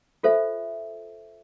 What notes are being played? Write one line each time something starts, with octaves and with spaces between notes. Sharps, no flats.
F4 A4 C5 E5